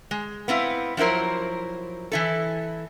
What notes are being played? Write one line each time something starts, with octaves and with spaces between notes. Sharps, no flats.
G#3
B3 C4 E4 F5
F3 F#3 E4 A#4 C5
E3 E4 A4